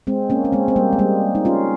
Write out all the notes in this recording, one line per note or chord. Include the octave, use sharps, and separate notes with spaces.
G#3 C4
A#3 C#4
C#4
G#3 C4
C4
G3 A#3
G#3
G3 A#3
D#4
C#4 F4